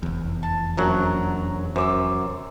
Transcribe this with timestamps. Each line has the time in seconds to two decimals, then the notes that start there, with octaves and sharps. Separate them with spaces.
0.03 F1 E2
0.43 A5
0.77 A#1 F#2 F#3 A#4 F#5
1.76 F#2 C5 D6 E6